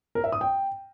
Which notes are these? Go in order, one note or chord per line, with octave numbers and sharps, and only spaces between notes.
A#4
E5
D#6
G5